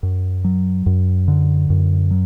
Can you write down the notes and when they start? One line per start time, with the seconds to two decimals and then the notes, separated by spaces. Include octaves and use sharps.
0.03 F#2
0.44 F#3
0.86 F#2
1.28 D3
1.70 F#2
2.11 F#3